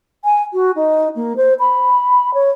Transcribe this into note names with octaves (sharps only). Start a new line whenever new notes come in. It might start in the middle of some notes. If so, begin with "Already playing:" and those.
G#5
F#4
D#4
A#3
C5
B5
C#5